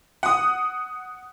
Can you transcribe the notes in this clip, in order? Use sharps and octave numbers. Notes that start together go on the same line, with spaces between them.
F#5 D#6